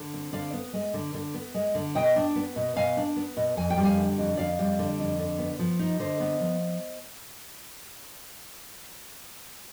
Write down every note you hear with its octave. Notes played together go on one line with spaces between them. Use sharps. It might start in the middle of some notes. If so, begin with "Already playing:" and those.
Already playing: D3
C4
D3 D5 F5
B3
G#3
D3
D3
B3
G#3
D3
B2 D#5 G5
D4
B3
B2
B2 F5 G#5
D4
B3
B2
F2 G#5
G5
G3
F5 G#5
D3
F2
F2 D5 F5
G3
D3
F2
D3
B3
F3
D#4
D3 C5 D#5
B3
F3